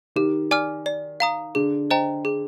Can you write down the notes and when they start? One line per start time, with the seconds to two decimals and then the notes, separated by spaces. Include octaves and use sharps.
0.16 D#3 G4
0.51 D5 G#5 D6 F6
0.86 D5
1.20 F5 A#5 D#6
1.55 D3 G#4
1.91 C5 D#5 G5 A#5
2.25 G#4